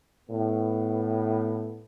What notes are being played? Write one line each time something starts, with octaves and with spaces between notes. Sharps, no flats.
A2 B3